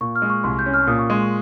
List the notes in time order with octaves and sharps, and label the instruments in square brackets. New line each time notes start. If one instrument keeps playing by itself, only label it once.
[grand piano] A#2 [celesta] C#6
[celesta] F6
[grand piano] G#3
[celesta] C#6
[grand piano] C2 [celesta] C6
[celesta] G6
[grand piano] C#4
[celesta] F6
[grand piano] A#2 [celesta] D#6
[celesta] C#6
[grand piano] G#3 [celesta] C6
[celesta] C#6